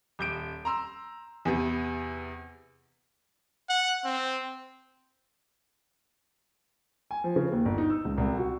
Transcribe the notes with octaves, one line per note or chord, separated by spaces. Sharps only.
D#1 G6 D7
A#5 C6 E6
E2 C3 B3
F#5
C4
G#5
F3
C#3
D#2
G1
D#4
E6
C#2
C2
F#4